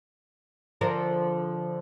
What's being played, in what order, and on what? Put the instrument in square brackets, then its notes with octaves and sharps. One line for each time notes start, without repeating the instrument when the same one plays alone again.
[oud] D3 F3 A#4